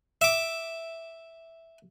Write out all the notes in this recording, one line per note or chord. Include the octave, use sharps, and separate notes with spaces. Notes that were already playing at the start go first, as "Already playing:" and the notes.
E5 D6